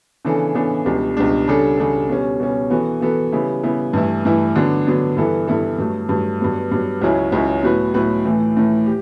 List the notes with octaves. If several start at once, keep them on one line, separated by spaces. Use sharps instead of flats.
C#3 E3 B3 D4 A4
C#3 E3 B3 D4 A4
C#2 B2 G3 D4
C#2 B2 G3 D4
C#3 G3 D4 A4
C#3 G3 D4 A4
B2 G3 C#4
B2 G3 C#4
E3 B3 F#4 A4
E3 B3 F#4 A4
C#3 G3 B3 E4
C#3 G3 B3 E4
G2 E3 A3 E4
G2 E3 A3 E4
D3 F#3 B3 D4
D3 F#3 B3 D4
G2 E3 B3 E4 A4
G2 E3 B3 E4 A4
G2 F#3 A3
G2 F#3 A3
G2 F#3 B3
G2 F#3 B3
C#2 C#3 F#3 C#4 E4
C#2 C#3 F#3 C#4 E4
A2 F#3 B3 F#4 B4
A2 F#3 B3 F#4 B4
A2 E3 A3
A2 E3 A3
G4